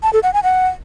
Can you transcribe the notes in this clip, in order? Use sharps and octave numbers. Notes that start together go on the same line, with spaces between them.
A5
A4
F#5
G#5
F#5